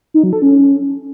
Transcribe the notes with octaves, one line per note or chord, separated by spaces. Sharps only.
D#4
F#3
A4
C#4